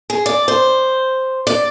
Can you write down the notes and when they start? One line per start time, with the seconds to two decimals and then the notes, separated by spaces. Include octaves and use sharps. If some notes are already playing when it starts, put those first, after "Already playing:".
0.10 G#4
0.26 D5
0.48 C5
1.47 D5